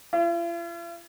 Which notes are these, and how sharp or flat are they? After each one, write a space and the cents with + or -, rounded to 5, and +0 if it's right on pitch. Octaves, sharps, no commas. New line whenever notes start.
F4 -45